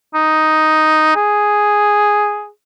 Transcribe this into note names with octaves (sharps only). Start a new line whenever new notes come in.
D#4
G#4